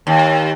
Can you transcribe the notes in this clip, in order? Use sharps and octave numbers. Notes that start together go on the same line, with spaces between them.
D#2